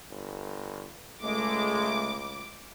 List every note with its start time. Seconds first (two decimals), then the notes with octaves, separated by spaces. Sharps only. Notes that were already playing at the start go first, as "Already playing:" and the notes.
0.10 G1
1.23 C#2 G#3 A3 D6